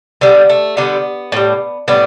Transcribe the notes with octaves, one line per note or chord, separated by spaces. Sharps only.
D3 G3 B3
A3
D3 G3 B3
A2 G3
A2 G3 B3 D4